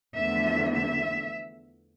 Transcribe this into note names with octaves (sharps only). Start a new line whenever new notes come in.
E2 D3 F3 A3 E5
E5